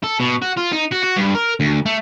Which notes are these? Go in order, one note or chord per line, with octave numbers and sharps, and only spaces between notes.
A4
B2
F#4
F4
D#4
F#4
F#4
G2
A#4
D2
A3